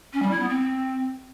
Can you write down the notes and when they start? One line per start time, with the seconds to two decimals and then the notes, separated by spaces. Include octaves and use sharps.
0.13 C#4
0.22 G3
0.31 E4
0.40 B3
0.49 C4